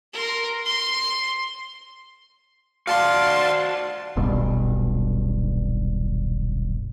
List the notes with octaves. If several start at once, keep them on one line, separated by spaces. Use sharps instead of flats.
A#4 C6
C6
F#4 D5 F5 A5 C6
D#1 B1 G2 B2